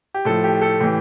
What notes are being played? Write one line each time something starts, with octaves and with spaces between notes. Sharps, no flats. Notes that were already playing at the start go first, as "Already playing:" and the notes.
G4
A2 F3 A4
G4
A4
A2 E3 G4